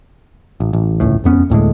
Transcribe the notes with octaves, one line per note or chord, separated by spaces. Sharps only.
A1
A1
D1 G1 C#2 A2
E1 F2 B3 C#4
D2 A2 D3 G#3